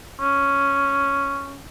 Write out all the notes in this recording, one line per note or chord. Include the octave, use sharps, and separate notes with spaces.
C#4